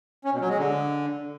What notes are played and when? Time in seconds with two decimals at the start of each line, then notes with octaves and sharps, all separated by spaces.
0.24 C#4
0.33 B2
0.41 F#3
0.50 G#3
0.58 D3